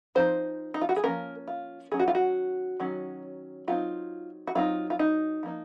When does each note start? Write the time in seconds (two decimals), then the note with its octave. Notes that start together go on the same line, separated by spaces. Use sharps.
0.15 F3 C4 D#4 C5
0.74 D#4
0.81 F4
0.89 F#4
0.96 G#4
1.04 F3 A#3 C#4 A#4
1.47 F4
1.91 D#3 F#3 C#4 G#4
1.99 F#4
2.08 F4
2.15 F#4
2.80 D#3 F#3 C#4
3.68 F#3 C4 D#4 F4
4.47 F#4
4.55 F#3 C4 D#4 F4
4.90 F4
4.99 D#4
5.43 F3 A#3 D#4